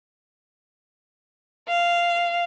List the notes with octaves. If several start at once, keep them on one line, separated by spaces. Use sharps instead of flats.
F5